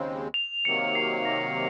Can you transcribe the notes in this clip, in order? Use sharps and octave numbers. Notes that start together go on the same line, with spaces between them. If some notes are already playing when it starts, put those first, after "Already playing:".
Already playing: D#2 C#3 G#3 C4
F7
C3 D#3 F#3 A#3 C#7
C7
A#6